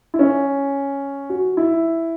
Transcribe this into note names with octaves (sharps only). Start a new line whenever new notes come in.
E4
C#4
F#4
E4